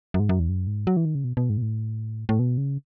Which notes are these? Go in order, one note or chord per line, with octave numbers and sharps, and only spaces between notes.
F#2
G#2
F#2
E2
F#2
G#2
F#3
E3
D#3
C#3
B2
B2
G#2
B2
A2
A2
B2
C#3